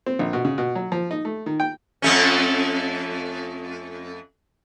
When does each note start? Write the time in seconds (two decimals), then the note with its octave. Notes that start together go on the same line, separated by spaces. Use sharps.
0.06 C4
0.19 A#1
0.33 B2
0.45 C#3
0.58 B2
0.75 F#3
0.92 F3
1.11 D#4
1.25 A3
1.46 D#3
1.60 G5
2.02 F2 A3 C#4